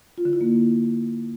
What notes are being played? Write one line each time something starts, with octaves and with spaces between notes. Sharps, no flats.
F4
D3
E4
A#3